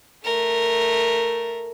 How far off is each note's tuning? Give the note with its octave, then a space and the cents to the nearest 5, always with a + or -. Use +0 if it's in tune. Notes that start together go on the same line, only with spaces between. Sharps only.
A3 +0 A#4 +0